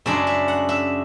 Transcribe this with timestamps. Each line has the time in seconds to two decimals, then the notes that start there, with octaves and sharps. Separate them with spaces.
0.06 F#2 C#3 G#3 D4 E5
0.27 E5
0.48 F#5
0.69 E5